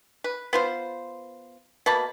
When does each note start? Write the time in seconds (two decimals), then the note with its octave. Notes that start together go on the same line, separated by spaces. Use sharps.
0.24 B4
0.53 B3 F4 C5
1.86 B2 A#3 A5 B5